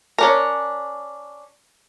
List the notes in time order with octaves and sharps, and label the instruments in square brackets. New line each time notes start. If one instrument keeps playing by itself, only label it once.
[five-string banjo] C#4 D4 A#4